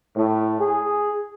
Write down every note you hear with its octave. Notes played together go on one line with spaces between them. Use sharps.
A2
G#4